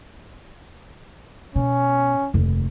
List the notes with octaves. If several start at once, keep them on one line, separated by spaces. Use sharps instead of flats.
B2 C#4
F1 D#2